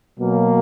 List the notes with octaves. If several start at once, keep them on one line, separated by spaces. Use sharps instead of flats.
B2 F#3 A#3